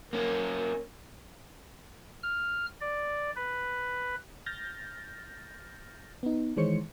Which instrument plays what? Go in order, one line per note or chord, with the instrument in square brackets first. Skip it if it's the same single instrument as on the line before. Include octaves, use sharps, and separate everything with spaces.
[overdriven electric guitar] A#3 C#4 [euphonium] A#4
[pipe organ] F6
D5
B4
[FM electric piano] F6 G6 A6 A#6
B3 D#4
D#3 E3 G#3 C5 C#5 C#7